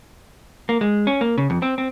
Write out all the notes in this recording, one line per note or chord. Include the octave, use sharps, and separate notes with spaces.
A#3
G#3
C#4
A#3
C#3
F2
C4
C4